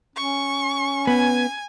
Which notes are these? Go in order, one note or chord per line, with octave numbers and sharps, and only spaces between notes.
C#4 C#6
B3 G#5